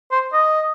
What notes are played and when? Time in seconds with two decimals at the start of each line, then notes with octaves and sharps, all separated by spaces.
0.12 C5
0.33 D#5